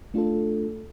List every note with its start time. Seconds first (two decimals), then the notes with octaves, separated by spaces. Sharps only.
0.14 A3 D4 F4 A4